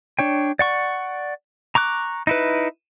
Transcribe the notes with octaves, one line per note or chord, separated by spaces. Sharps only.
D4 C#5 G5
D5 F#5 C#6
A#5 C#6 D6 F#6
D#4 E4 B4